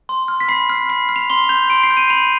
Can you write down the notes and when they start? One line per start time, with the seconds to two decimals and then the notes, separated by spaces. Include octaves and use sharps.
0.09 C6
0.28 F6
0.40 B6
0.48 B5 C7
0.70 F6
0.89 B5 C7
1.09 F6
1.16 F7
1.30 C6 G7
1.49 G6 F7
1.70 C6 D7
1.83 C7
1.90 G6
1.97 D#7
2.10 B5 F7